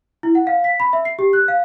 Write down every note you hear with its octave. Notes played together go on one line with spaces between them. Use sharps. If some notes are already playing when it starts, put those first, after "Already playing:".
E4
F#5
F5
B6
B5
E5
C7
G4
F#6
F5